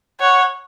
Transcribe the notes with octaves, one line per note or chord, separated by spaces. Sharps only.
C#5 F#5